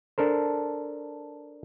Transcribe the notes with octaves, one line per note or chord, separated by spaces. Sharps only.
D4 A4 A#4 C5